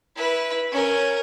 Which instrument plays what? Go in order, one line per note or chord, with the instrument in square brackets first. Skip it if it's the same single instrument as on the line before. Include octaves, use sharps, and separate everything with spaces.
[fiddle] E4 B4
C#4 A#4